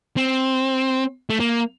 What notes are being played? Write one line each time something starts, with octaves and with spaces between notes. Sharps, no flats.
C4
A3
A#3